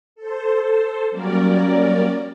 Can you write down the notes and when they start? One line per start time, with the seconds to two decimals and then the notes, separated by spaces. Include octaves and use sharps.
0.16 A4 C5
1.11 F#3 G3 A#3 C#4 A#4 D5